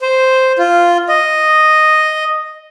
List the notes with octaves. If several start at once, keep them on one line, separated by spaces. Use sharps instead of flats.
C5
F4
D#5